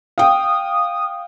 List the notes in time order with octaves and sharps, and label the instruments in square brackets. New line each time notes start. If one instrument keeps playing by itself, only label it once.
[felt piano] F5 G5 [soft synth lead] D#6